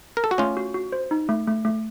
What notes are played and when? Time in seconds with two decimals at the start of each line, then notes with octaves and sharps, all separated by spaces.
0.17 A#4
0.24 A4
0.31 F#4
0.38 A3 C#4 F4
0.57 F#4
0.74 F#4
0.92 C5
1.11 D#4
1.29 A3
1.47 A3
1.65 A3